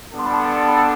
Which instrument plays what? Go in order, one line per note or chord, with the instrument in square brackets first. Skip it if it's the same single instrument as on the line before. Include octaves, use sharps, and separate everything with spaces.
[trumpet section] G3 B3 D4 A4
[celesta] C6
B5
A5 C6
C6
G5 B5